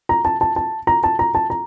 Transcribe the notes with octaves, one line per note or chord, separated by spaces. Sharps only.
A#5
A5
A5
A5
A#5
A5
A#5
A5
A#5